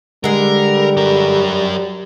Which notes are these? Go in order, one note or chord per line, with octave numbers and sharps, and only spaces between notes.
D3 G3 G#3 A#4
F#3 A#4